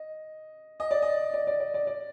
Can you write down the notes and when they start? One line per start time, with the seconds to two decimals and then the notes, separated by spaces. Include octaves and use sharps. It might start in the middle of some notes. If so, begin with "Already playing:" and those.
Already playing: D#5
0.80 D#5
0.91 D5
1.02 D#5
1.34 D5
1.47 D5
1.60 D5
1.74 D5
1.87 D5